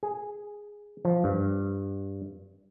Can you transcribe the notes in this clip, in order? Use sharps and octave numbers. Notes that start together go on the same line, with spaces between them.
G#4
F3
G2